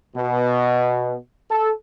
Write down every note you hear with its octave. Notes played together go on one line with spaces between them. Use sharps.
B2
A4